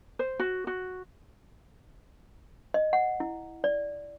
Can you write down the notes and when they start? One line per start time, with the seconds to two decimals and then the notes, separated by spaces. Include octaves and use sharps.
0.19 C5
0.40 F#4
0.67 F#4
2.74 D#5
2.93 F#5
3.20 E4
3.64 D5